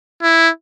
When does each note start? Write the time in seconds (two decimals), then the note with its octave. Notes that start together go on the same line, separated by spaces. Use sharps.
0.22 E4